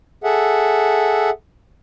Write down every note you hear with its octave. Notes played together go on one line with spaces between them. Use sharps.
G#4 A4 E5 F#5